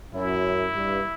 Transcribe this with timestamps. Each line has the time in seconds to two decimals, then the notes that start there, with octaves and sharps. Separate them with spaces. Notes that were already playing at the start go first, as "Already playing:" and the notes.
0.14 F#2 E4
0.74 G2